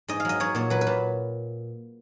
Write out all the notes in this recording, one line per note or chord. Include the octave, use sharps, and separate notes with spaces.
G#2 D#5
F5
F#3 D#5
F#3 C#5
A#2 C#5
F#3 B4
B4
A#2